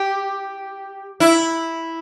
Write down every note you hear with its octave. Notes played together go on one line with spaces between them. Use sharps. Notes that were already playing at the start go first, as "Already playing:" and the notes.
Already playing: G4
E4